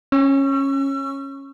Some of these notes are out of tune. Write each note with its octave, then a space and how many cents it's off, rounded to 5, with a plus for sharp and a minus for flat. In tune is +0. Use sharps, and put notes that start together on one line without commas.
C#4 -15 C#6 +0 E6 +40